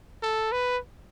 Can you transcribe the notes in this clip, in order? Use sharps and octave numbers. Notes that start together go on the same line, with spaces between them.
A4
B4